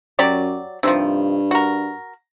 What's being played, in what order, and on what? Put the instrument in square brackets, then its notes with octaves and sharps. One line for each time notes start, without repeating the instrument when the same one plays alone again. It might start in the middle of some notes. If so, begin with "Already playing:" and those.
[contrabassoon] F#2 [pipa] F#3 G4 D5
[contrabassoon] G2 [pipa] C3 D#3 F3
[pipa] F#4 A#4